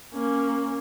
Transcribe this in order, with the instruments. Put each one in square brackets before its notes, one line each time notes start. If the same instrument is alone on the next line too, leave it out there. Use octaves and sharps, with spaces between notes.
[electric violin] A#3 C#4